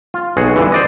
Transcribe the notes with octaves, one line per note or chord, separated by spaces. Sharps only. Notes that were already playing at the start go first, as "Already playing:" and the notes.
F4
B1 F#4 G#4
G2 D3 E3
C5 D5 D#5